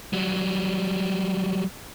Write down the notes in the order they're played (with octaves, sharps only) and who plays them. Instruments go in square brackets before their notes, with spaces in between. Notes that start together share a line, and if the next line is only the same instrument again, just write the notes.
[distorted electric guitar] F#3 G3